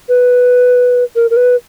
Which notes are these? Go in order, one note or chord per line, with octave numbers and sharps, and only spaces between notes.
B4
A#4
A#4
B4